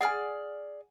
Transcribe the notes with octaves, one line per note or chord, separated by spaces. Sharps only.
G#4 D5 F#5 G#5 F6